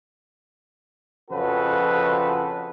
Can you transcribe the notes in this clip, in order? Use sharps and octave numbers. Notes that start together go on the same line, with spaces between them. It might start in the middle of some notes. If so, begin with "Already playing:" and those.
F2 C#3 F3 F#4 A4 B4